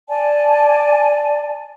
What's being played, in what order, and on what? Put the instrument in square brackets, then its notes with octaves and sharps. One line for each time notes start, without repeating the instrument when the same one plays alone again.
[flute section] D5 G#5 A5